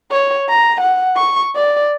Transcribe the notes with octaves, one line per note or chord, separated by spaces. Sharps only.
C#5
A#5
F#5
C#6
D5